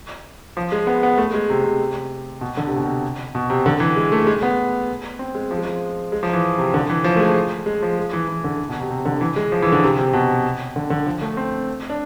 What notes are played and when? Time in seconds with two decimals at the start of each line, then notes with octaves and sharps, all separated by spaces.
0.57 F3
0.72 G#3
0.87 B3
1.03 B3
1.18 A3
1.34 G#3
1.50 C3
1.64 C3
2.41 B2
2.57 D3
2.67 C3
2.76 B2
2.85 C3
3.35 B2
3.50 C3
3.66 D3
3.80 E3
3.96 G#3
4.12 A3
4.27 G#3
4.43 B3
5.19 C4
5.35 G#3
5.51 F3
5.57 G#3
5.65 F3
6.12 G#3
6.23 F3
6.33 E3
6.58 C3
6.74 D3
6.90 E3
7.04 F3
7.16 A3
7.20 G#3
7.66 G#3
7.82 F3
7.97 G#3
8.13 E3
8.28 E3
8.44 D3
8.69 B2
8.80 C3
8.90 C3
9.05 D3
9.21 E3
9.36 G#3
9.52 F3
9.62 E3
9.72 D3
9.83 C3
9.99 C3
10.13 B2
10.76 D3
10.90 D3
11.06 F3
11.22 A3
11.37 C4
11.90 D4